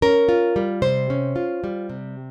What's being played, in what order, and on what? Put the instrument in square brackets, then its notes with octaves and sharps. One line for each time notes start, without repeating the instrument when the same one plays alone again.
[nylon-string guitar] C#4 A#4
F4
G3
C3 C5
C#4
F4
G3
C3